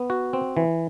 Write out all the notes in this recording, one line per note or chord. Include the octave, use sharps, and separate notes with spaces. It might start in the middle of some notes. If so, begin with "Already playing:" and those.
Already playing: B3
F#4
C4
E3